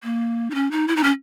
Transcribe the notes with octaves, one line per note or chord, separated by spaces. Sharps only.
A#3
D#4
C#4
D#4
E4
D#4
C#4